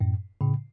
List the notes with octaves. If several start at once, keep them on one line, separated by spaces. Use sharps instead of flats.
F#2 A2
A2 C#3